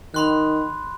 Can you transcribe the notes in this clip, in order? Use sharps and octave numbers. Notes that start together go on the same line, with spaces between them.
D#3 B5 C6 F#6